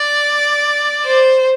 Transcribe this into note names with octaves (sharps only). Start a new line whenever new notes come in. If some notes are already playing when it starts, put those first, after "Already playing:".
Already playing: D5
C5